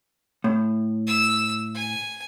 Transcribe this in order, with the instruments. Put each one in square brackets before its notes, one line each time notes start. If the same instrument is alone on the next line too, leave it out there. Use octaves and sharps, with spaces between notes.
[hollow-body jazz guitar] A2
[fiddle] E6
G#5